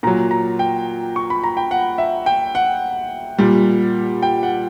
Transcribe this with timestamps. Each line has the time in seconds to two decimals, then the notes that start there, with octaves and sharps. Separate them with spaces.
0.03 A#2 F#3 A#5
0.31 A#5
0.59 G5
1.16 C#6
1.30 B5
1.44 A#5
1.57 G5
1.71 F#5
1.98 E5
2.26 G5
2.55 F#5
3.38 A#2 G3
4.22 G5
4.43 F#5